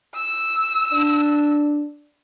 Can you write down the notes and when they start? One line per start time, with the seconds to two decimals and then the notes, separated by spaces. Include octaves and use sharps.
0.15 E6
0.92 D4